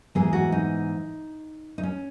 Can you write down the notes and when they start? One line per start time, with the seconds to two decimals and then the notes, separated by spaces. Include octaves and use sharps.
0.15 G#2 E3 G#3 B3 G#4
0.33 F#4
0.52 D#4
1.78 D#4
1.83 C#4